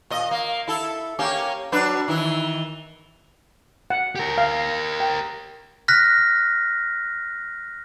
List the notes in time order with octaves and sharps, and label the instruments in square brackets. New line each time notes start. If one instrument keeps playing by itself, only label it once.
[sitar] A#2 D#5
A#3
E4 A4
A#3 C#4 G4
F#3 D4 B4
D#3 E3 E4
[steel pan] F#5
[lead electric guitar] G4 A#4
[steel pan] F5
G5
[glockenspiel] F6 F#6 A#6 B6